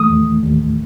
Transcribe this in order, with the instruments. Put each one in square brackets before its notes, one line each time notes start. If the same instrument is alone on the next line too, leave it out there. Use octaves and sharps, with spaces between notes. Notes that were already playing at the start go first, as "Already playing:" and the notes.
Already playing: [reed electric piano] E3 A3 [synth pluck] D#6
[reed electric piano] D#2
D#2